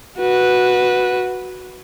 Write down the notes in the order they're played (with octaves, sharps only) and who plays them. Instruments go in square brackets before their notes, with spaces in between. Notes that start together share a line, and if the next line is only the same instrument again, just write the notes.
[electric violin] F#4 B4